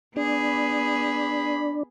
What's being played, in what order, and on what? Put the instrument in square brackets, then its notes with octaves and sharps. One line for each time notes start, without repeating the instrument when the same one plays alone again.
[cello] B3 G#4 [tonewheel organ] D4 [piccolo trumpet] B5